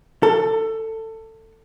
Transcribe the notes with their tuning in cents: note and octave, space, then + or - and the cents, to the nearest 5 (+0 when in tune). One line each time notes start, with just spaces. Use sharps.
A4 +20